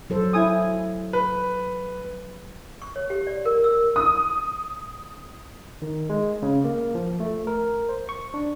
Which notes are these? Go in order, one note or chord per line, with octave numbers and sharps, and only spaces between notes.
F#3 A4 C5
E4 G#5 D#6
B4
C#6
C#5
G4
D5
A#4
E6
D#6
D#3
G#3
C#3
A#3
F3
A3
A#4
C5
C#6
D4